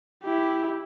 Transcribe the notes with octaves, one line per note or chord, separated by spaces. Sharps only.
E4 G4